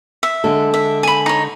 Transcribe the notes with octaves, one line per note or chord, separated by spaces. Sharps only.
E5
D3 G#3 A4
E5
G#5 B5
D#4 C#5